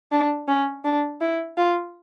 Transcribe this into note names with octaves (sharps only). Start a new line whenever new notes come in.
D4
C#4
D4
E4
F4